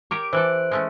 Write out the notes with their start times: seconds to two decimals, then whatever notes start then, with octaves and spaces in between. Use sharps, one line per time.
0.11 G4 A#4 C#5 D6 D7
0.33 E3 A4 C5 F#6 D7
0.71 G#3 A3 C#4